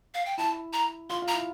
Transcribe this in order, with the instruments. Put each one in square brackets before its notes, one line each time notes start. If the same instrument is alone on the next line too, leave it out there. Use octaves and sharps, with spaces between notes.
[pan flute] F5
G5
[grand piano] E4 [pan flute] A5
[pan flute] A#5
[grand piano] F4 [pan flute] C6
[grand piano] F4
[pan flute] A#5
[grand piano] E4